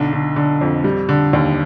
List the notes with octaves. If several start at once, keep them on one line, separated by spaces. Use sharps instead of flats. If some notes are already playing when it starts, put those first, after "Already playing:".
Already playing: B1 D3
D3
D3
F2
G3
D3
D#2